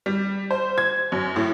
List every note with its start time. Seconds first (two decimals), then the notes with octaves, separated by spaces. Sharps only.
0.06 G3
0.51 C5
0.78 G#6
1.12 F#2
1.36 A2